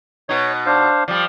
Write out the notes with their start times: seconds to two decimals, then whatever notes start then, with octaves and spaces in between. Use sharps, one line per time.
0.29 B2 D#4 C#5
0.66 D4 C5 F5
1.08 F3 G3 D5